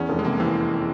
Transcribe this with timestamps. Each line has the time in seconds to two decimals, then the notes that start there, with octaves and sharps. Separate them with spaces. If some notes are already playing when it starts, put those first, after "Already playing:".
Already playing: E2 C#4
0.09 F1
0.19 G#3
0.25 C3 A#3
0.40 E3 C4